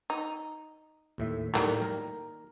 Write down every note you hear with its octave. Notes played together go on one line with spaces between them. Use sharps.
D#4
D#2 A2 E5
A2 D#3 F3 G3 A#3
A#4